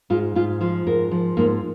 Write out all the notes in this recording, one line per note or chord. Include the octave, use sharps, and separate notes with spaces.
G#2 F4
G#2 F4
F3 F4
G#2 A#4
F3
G#2 A#3